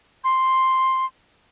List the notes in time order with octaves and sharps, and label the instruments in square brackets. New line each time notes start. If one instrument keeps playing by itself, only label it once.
[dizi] C6